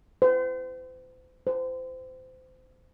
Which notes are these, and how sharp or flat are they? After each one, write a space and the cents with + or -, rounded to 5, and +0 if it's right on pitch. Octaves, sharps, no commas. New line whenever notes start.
C5 -40
C5 -25